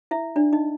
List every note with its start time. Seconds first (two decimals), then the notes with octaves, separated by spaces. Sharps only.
0.11 E4 E5
0.36 D4 D5
0.53 D#4 D#5